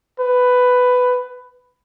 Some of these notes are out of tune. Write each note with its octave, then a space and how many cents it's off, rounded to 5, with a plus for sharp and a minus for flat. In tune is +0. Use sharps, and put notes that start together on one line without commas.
B4 +10